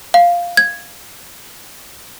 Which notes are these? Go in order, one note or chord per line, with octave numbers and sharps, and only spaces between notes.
F5
G#6